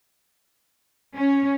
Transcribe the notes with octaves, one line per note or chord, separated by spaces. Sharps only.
C#4